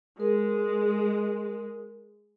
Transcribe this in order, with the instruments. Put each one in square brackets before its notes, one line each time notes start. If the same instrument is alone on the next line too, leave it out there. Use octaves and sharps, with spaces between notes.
[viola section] G#3 [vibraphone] G#4 A#4